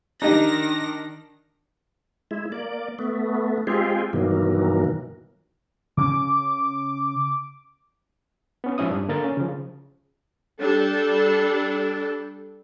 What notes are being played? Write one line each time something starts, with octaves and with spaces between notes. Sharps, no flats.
D#3 D4 D#4 G4 D#5 A#6
G#3 E4
A#3 D5
A3 B3
G#3 C4 F4 G4 G#4
G2 B2 D#3 E3 F#3 A#3
C#3 C4 C#4 D6
B3 C#4
G#2 F3 C#4 E4 D#6
G2 D4
D3 A#3 A#4 A6
C#4
C#3 F3
G3 D4 A4